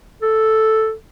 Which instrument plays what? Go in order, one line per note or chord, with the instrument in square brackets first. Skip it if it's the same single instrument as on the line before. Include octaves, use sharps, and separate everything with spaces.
[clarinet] A4